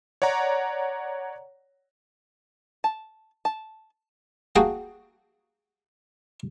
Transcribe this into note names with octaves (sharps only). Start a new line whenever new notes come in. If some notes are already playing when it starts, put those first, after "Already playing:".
C#5 D5 F#5 A#5
A5
A5
A#3 F#4 G#4 G5 A5